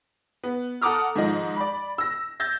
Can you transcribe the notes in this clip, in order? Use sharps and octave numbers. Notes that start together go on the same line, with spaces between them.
B3
A4 F#5 A#5 D6 D#6 F6
G#2 D#3 F3 D#5
D5 B5
E6 A#6
E6 G6 A6 A#6